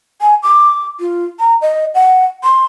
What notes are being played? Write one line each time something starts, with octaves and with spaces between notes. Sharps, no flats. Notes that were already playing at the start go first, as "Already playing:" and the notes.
G#5
D6
F4
A#5
D#5
F#5
C6